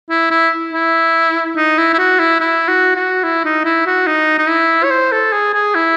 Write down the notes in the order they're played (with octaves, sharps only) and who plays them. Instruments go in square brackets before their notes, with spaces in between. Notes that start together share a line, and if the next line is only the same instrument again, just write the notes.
[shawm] E4
E4
E4
D#4
E4
E4
F#4
E4
E4
F#4
F#4
E4
D#4
E4
F#4
D#4
D#4
E4
C#5
C5
A4
G#4
G#4
E4